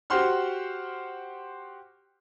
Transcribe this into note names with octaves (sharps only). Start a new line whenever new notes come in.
F#4 G4 C5 F#5 C6 F6